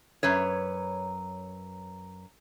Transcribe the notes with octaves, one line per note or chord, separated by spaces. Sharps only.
F#2 B4 C#5